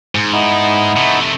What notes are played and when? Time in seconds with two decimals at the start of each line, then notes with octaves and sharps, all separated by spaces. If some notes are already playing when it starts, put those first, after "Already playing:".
0.15 G#2
0.32 B3 D#4 E4
0.96 C3 A3